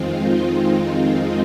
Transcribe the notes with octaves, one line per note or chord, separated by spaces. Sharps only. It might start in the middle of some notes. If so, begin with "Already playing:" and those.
Already playing: F2 D#3 G#3 C4 D#4 F4